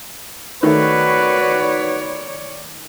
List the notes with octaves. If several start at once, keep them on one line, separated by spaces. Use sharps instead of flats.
D#3 A3 F#4 B4 C#5 D5